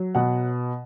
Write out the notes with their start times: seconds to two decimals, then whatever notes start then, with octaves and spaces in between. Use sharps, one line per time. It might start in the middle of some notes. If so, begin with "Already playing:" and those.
Already playing: F#3
0.15 B2 F#5